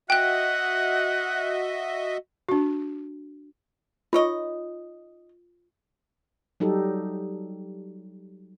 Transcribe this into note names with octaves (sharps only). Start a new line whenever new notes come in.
F#4 D#5 E5 F#5 G5 F#6
D4 F#4
D#4 F4 C#5 D#5
F#3 G3 D#4 G4 A4